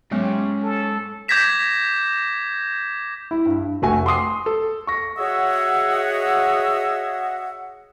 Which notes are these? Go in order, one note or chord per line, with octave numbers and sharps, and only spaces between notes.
G#2 F#3 G#3 B3 C#4 G4
A4
D6 G6 G#6 A#6 B6 E7
E4
G2
F1 A3 F#4 G#5
C6 D6 D#6 C7
A4
C#6 A#6
F#4 G#4 C#5 D#5 E5 F#5